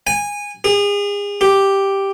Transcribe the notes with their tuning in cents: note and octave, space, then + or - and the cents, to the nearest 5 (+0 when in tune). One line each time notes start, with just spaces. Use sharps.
G#5 -20
G#4 -35
G4 +0